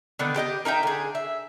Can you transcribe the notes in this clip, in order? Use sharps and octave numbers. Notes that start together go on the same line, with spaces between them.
D3 D#3 B3
G4 D#5 G5
A#3 D#4 E5 G5
D3 G#4
E5